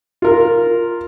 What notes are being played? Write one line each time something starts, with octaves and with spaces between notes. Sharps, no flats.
F4 A#4